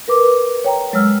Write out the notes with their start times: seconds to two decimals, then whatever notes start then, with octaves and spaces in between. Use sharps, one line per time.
0.08 A#4 B4 D6
0.64 C#5 G5 A#5
0.93 F#3 G#3 C#5 E6 F6